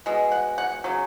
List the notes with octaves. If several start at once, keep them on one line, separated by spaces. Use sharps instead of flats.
B2 G#3
F#5
F#5
C#3 F#3